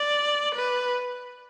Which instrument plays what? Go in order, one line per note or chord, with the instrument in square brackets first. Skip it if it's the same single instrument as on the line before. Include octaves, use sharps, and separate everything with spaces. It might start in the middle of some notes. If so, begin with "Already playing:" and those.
Already playing: [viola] D5
B4